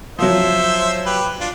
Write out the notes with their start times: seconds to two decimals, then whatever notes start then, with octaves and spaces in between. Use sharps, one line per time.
0.19 F3 F#3 C5 E5
1.06 G4 B4
1.40 D4 F4